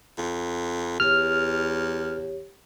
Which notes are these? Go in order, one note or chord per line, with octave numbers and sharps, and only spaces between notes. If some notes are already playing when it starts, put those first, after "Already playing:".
F2
E2 G4 C#5 F6